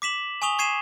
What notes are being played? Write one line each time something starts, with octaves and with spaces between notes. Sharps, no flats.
D6 B6 E7 F#7
G#5 C#6 D#6 F7 G7
C#6 G#6 C7 D#7 E7